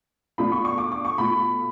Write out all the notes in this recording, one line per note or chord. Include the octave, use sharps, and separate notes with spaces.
B2 A3 D4 F4 B5
C#6
C#6
D6
D6
C#6
B2 A3 F4 B5